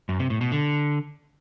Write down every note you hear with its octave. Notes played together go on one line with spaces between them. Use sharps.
F#2
C3
A2
B2
D3